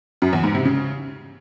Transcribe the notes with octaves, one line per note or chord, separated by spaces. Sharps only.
F#2
E2
G#2
C3
C#3